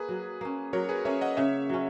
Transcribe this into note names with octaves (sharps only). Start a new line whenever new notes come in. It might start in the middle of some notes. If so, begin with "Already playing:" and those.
Already playing: A#3 G#4 B4
F#3
A#3 C#4
F#3 A#4 C#5
G#4 B4
A#3 C#4 C#5 E5
D#5 F#5
C#3 C#5 E5
F#3 C#4